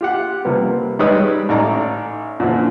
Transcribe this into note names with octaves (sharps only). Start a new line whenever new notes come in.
F4 G4 F#5
C3 F3 G3 A#3 B3
D#3 G3 G#3 B4 C#5 D#6
A1 D#4 D5 A#5
A#2 D3 E3 F3